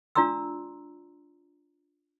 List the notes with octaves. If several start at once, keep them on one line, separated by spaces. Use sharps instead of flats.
D4 F4 D5 A#5 C6 E6